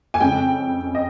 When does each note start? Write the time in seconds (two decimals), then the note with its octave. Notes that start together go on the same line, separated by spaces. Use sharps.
0.14 G#5
0.20 F2 C#3 G#3 G5
0.95 D#5